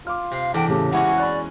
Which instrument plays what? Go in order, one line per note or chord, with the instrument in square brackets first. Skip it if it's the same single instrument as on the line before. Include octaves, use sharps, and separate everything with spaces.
[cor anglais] F4 [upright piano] D6 F6
[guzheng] C3 [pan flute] F5
[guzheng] E2 [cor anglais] D4 [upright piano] A4 F#5 [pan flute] G5
[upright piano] A2 C#3 [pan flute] G4 [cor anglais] A4
[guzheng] G#3 C#4 F#4 [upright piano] E4 [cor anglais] F#5
[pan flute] D5 [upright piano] B5 C#6 F#6